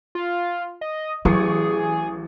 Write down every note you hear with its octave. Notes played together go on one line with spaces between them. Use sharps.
F4
D#5
A1 F#3 G#4 C#6 D#6